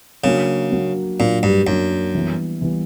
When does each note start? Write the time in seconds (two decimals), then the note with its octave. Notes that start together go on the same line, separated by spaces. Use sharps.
0.24 C#3 F#3 A#3 D4 F#4
0.71 F#3 A#3 D4 F#4
1.19 A#2 F#3 A#3 D4 F#4
1.43 G2
1.67 F#2 F#3 A#3 D4 F#4
2.15 E3 G3 B3
2.62 E3 G3 B3